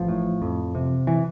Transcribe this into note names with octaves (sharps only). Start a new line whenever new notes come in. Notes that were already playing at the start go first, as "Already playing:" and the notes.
Already playing: A1 F3
A2
F2
C3
E3